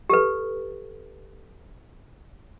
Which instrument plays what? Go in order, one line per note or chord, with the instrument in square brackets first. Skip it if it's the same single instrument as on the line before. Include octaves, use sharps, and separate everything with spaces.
[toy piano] G4 A4 B4